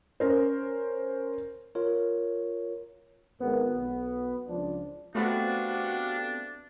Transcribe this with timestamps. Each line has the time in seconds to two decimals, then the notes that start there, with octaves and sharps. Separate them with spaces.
0.20 C#4 A#4 C5
1.75 F4 A#4 C#5
3.40 G#1 G#2 B3 A#4
3.76 B1
4.47 C#2 F3 D4
5.15 A3 B3 C4 D4 F#4 G4 F5